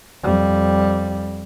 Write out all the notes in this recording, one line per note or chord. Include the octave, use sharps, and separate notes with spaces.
F2 G3